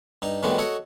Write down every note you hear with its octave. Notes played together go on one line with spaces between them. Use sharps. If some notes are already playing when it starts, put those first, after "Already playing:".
G2 D#4
A2 D#3 G3 G#3 B3 F#4
F#4 A4 C#5 D#5